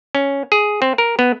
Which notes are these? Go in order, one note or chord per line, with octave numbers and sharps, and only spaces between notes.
C#4
G#4
C4
A#4
B3